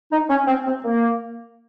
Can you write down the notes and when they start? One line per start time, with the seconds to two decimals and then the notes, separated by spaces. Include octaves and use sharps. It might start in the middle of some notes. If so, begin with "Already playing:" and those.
0.12 D#4
0.30 C#4
0.47 C4
0.66 C4
0.84 A#3